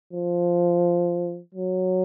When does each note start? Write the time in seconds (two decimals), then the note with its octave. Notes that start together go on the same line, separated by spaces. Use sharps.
0.13 F3
1.55 F#3